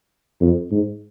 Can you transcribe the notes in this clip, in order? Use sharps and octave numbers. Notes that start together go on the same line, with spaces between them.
F2
G#2